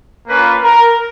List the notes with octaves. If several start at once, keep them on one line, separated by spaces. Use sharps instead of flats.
A#3 C#4 F4 B4
A#4